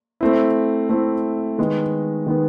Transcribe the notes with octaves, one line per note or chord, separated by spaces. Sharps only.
A3 C4 E4
A3 C4 E4
D#3 G#3 B3
D#3 G#3 B3